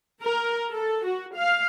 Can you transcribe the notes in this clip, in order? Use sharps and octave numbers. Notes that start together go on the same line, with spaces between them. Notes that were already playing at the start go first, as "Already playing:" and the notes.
A#4
A4
F#4
F5